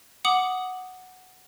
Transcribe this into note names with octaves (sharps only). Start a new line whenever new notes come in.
F#5 D6 D#6 F#7